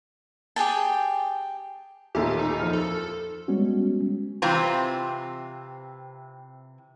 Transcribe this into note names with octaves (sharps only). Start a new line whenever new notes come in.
G4 G#4 G5 A5
A1 D#2 A#2 G4
D#4
F2 F3 F6
A4
G3 G#3 B3 C#4 F#4
C3 E3 C4 F4 A#5